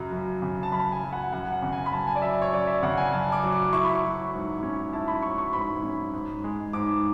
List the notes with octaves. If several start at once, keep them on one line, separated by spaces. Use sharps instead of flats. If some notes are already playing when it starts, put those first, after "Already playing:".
Already playing: F#2 C#3 F#3
F#2
C#3
A5
F#2 B5
G#5
F#3
F#5
F#2 F#5
F#5
C#3
G#5
B5
F#2 A5
G#5
D5
F#3 E5
C#5
F#2 D5
E5
C#3 F#5
G#5
F#2 A5
D6
F#3
D6
E4 C#6
B5
C#6
F#3
G#2
C#4
E4 A5
B5
F#3 C#6
C#6
G#2 B5
C#4
G#2
G#3
G#2 D6